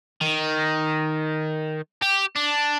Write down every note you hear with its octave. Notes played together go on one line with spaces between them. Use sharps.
D#3
G4
D4